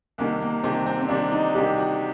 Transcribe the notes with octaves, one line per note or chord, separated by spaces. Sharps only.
C2 C3 D#3 A#3
A#3
C2 C3 D#3 C4
C4
C4
C2 C3 D#3 D4
D#4
C2 C3 D#3 G4
F#4